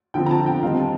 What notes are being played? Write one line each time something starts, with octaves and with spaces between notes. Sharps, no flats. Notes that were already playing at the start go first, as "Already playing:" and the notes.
D3 F3 C4 G5
A#5
A5
G5
D#3 G3 C4 D#4 F5
A5